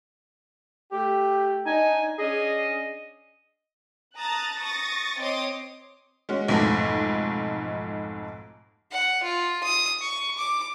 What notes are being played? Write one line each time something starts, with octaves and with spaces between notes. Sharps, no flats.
A3 G4
D4 D#4 G#5
C#4 D4 G#4 D#5
A5 A#5 D#6 F#6 A6
C#6 D#6 A6 A#6
C4 C#5 D#5 C6 D6 D#6
G#3 C#4 F#4
B1 F2 G#2 A3
F#5
F4
D#6
C#6
D6